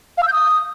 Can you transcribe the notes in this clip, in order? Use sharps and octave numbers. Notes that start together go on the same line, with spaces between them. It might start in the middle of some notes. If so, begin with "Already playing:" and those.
F5
E6
G6
D#6